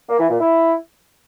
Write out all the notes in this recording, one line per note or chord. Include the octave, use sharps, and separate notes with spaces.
A#3
E3
A#2
E4